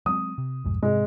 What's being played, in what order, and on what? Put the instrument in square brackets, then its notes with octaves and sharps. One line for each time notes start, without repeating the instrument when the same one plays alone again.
[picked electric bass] F#3 G#3 C4 [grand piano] D#6
[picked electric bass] C3
B1 F2 G#2
[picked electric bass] G#2 C3 C4 [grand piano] G#3